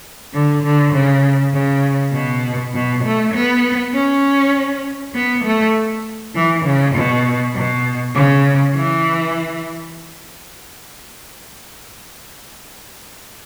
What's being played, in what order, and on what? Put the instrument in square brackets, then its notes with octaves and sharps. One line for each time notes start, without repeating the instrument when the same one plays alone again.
[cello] D3
D3
C#3
C#3
B2
B2
A3
B3
C#4
B3
A3
E3
C#3
B2
B2
C#3
E3